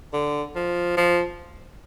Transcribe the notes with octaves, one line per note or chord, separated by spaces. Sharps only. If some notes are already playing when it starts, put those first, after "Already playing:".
D3
F3
F3